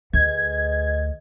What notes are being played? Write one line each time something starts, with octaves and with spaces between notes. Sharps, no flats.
D2 G#4 B4 D#5 G#6